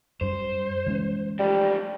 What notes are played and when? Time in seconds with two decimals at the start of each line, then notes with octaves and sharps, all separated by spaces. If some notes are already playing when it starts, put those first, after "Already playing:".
0.21 F#2 G3 C5
0.86 E3 G#3 C#4
1.39 F3 G3 A3